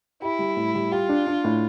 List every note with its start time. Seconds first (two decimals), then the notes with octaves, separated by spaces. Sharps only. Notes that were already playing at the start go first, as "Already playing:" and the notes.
0.22 E4 G4
0.39 G3
0.57 A2
0.75 G3
0.92 F4 G4
1.09 D4
1.27 D4
1.44 A2